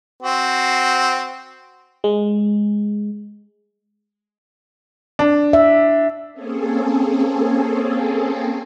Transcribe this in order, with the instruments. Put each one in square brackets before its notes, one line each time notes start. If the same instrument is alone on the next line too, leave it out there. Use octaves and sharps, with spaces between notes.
[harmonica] C4 F#4
[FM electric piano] G#3
[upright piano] D4
[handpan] E5
[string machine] A#3 C4 C#4 G#4 A4